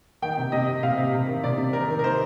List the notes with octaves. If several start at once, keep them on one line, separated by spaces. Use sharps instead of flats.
D#3 G5
C3
C3 D#5
C3
C3 F5
C3
C3
D#3
C3 D5
C3
D#3 A#4
D#3
A#4
D#3 C5